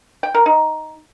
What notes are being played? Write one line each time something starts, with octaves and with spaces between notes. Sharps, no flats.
G5
A#4
D#4